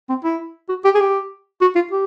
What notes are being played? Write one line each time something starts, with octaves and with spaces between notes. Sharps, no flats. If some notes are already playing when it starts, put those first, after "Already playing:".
C4
E4
F#4
G4
G#4
G4
F#4
F4
G4